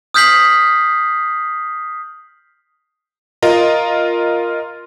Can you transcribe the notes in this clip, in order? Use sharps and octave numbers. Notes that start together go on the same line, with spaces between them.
D#6 F6 G6 B6 C7 F#7
F4 A#4 D#5